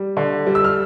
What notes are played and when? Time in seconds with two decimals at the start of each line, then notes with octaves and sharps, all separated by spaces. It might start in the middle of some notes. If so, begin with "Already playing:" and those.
Already playing: G3
0.17 D3
0.47 G3
0.55 E6
0.64 F6